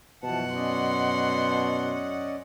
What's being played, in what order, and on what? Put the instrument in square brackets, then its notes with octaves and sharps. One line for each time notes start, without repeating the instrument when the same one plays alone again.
[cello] F#2 F#5 [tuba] B2 [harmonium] E3 F3 A5
[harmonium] C#4 D5 D#5 [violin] C6